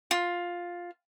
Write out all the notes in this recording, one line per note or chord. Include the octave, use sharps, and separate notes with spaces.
F4